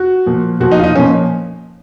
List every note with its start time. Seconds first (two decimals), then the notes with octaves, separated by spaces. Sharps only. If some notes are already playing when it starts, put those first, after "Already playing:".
Already playing: F#4
0.26 A#2 F3
0.60 A#2 F3 F#4
0.72 D#4
0.80 F4
0.84 D#4
0.95 A#2 F3 C#4